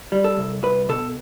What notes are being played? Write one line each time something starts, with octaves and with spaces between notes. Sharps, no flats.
G3
A4
C2
C2 B4
B2 A4